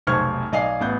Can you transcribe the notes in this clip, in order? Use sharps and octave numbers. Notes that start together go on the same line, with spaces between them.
F1 B1 C5 C#6 F6 G#6
B1 D5 D#5 F5 G#5 C7
A1 B3 G6